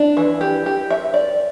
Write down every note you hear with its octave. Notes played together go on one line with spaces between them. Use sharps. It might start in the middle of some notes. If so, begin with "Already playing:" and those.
Already playing: D4
E3
G4
G4
E5
D5